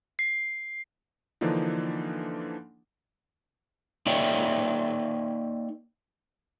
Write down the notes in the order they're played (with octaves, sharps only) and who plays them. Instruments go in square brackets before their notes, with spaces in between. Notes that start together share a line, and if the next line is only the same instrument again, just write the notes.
[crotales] C7
[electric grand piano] D3 E3 F3 A#3 D4 D#4
[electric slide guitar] A#3 D#4 C#5 D5 E5 G5